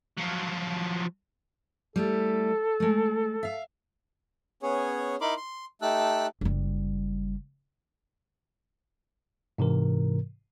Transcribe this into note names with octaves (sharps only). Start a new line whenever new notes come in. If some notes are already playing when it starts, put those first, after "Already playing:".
F3 F#3
G3 A3 E4 A4
G#3 A3
E5 F5
B3 C#4 G#4 C#5
D#4 E4 A#4 B5 C6 D6
C6
A3 D#4 G4 A5 E6 F#6
F#1 G3
G#2 C3 E3 A#4